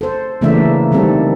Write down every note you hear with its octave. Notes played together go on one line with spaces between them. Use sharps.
A4 C5
C#3 E3 A3 A#3 D4 E5
D#3 G3 C4 D4 A4